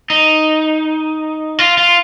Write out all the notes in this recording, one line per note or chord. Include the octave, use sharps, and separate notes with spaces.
D#4
F4
F4